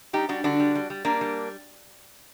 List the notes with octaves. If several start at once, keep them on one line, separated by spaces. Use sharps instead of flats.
G3 D#4 G4
G3 D4 F#4
D3 D4 F#4
G3
G3
G3
G3 A#3 D4
G3